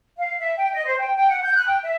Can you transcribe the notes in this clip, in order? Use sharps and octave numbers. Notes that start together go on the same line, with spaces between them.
F5
E5
G5
D#5
C5
G5
G5
F#5
G6
F#6
G5
E5